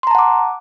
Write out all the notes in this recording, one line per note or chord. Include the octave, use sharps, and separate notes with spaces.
F#5 A5 A#5 C6 D6